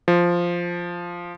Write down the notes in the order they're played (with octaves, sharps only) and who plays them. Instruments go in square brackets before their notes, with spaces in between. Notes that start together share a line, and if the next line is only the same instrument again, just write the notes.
[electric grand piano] F3